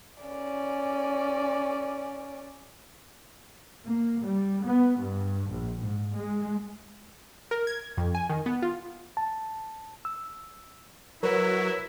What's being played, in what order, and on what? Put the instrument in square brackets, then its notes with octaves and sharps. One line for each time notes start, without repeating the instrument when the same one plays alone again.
[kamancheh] C#4 D5
[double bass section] A#3
G3
B3
G2
A#1
G#2
G#3
[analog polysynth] A#4
G#6
F2
G#5
D#3
B3
F4
[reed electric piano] A5
E6
[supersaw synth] F#3 [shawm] E4 [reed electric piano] A#4 B4